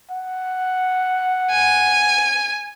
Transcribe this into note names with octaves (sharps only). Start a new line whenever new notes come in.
F#5
G#5